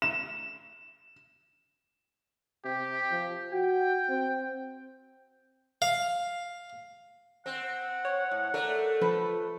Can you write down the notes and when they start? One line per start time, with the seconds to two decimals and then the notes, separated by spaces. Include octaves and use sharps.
0.02 E7
2.65 C3 G4
3.11 F3
3.52 F#4 G5
4.09 C4
5.82 F5
7.46 C4 F#5
8.05 C#5
8.31 A2
8.54 A3 A#4 D5
9.01 F3 A4 B4